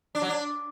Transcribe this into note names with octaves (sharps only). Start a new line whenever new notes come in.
D4
F#3
D4